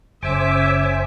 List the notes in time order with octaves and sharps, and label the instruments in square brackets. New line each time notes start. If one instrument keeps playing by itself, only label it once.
[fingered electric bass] F#1 [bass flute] C#3 [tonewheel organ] C5 G#5 D6 [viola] E5